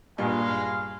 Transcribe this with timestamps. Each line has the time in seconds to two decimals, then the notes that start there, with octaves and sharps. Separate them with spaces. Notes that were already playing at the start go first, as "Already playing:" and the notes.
0.18 G2 A#2 G#3 F5